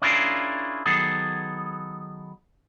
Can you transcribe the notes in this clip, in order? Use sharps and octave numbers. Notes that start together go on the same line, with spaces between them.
C#4 D4 E4 F4 G#4 A#4
D#3 F#3 B3 G#4 A4